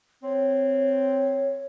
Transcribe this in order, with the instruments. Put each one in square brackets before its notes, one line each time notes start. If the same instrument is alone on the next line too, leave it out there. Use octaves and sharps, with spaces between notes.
[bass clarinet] C4 [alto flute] C#5